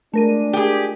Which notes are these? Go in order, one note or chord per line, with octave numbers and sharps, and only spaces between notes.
G#3 A3 D4 F4 A#4 D#7
G4 G#4